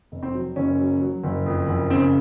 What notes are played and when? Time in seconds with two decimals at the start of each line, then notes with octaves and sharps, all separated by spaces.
0.12 F1
0.23 C4
0.34 F#3
0.56 F#1 C#4
0.79 F#3
1.01 F#3
1.23 F#1
1.46 F2
1.68 F#1
1.90 C#3 C4